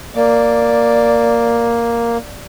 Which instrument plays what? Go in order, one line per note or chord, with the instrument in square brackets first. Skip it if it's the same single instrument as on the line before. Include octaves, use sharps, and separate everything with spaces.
[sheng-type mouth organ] A#3 [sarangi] D5